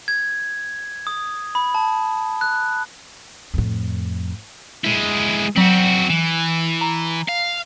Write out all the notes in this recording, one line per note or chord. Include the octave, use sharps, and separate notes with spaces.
G#6
D#6
B5
A5
F#6
F2 A2
G#3 E4
F#3 C4 F#4 B6 F#7
E3 E7
A#5
F5